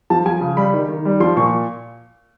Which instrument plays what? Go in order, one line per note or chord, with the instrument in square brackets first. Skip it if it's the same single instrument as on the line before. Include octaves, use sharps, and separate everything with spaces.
[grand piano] F3 A5
F3 G#5
C#3
G3 B5
D#3
D#3
G3
F3 C6
A#2 C#6